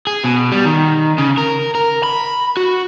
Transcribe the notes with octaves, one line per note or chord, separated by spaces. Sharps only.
G#4
B2
G3
D#3
C#3
A#4
A#4
B5
F#4